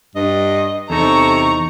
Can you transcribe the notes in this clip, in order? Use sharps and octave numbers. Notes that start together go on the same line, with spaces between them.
G2 D#5
E2 C3 D#4 A4 A#5 C#6